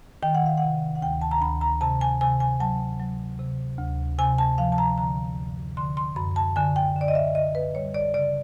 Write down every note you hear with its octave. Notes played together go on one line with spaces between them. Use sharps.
D#3 G5
F#5
F5
C3 F#5
F#5
D2 G5
A5
A#5
D2 B5
A#5
C3 A5
G#5
C3 G#5
G#5
F#3 A5
F#3
C3
D2
C3 G#5
A5
F3 F5
A5
A#5
D3 A#5
F#2
D3 C6
C6
F#2 B5
A5
D3 G#5
G5
D3
D5
D#5
E5
D3 D#5
B4
G3 C#5
D5
C#3 D5